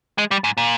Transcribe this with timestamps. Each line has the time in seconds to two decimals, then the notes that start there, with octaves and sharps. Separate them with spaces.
0.18 G#3
0.31 G3
0.44 G#2
0.57 A#2